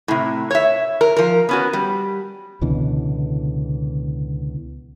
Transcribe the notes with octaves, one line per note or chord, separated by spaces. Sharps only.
A2 C3
C#5 E5
A#4
F3 A#4
B3 C#4 F#4
G3
C#2 B2 D3 E3